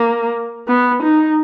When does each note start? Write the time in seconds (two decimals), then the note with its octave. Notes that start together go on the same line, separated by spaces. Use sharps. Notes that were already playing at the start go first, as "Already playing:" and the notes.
Already playing: A#3
0.67 B3
1.03 D#4